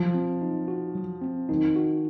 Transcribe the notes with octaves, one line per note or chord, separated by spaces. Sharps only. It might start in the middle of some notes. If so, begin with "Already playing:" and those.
Already playing: F3 F#3
C4
D#4
F#4
F#3
C4
D#3 D#4
F#4